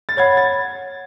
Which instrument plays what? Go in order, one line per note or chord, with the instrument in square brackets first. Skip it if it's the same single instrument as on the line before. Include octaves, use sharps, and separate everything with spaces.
[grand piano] A6
[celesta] C#5 F#5 B5 [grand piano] G#6
[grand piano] A6